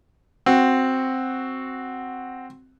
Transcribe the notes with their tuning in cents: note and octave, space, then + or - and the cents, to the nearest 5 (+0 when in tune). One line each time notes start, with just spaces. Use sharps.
C4 +0 F#4 +0